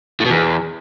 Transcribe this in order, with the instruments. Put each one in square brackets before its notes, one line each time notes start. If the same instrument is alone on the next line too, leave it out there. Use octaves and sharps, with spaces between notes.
[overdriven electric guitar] A2
B2
E2